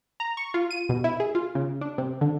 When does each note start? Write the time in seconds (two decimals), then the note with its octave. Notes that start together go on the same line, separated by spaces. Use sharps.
0.20 A#5
0.37 C#6
0.54 F4
0.71 D#7
0.89 B2
1.04 E4
1.20 G#4
1.35 F4
1.55 C#3
1.81 D4
1.98 C3
2.21 D3